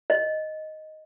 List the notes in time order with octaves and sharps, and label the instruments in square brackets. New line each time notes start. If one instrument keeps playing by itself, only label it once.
[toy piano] D#5